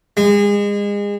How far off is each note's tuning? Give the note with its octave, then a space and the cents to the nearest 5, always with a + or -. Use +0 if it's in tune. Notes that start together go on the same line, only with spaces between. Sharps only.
G#3 -30